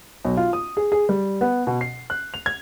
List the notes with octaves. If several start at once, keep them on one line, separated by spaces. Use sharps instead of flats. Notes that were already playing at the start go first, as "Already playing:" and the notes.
B1
F4
D#6
G#4
G#4
G3
B3
B2
C7
F#6
F7
G#6